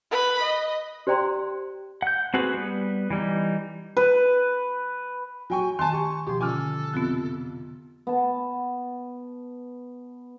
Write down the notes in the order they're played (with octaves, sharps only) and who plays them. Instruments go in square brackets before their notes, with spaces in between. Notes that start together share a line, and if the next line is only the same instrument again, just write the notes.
[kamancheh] B4 B5
D#5
[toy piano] G4 C5 D5 G5 A#5 C6
[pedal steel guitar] F#5 G6
C4 F#4 G#4 B4
G3 B3
E3 G3 D#4
[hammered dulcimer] B4
[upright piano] F#3 G5 C#6 [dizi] G#5
[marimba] D#3 [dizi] G#5 [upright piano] A5 C6
[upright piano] G4 [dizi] C#6
[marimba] B2 F3 [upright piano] G4 [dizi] C6
[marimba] D3 C#4 F4 [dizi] A4 [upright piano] G#5 D6 F6
[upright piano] F2 C3 [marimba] B3 F4 F#6
[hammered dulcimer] B3 A5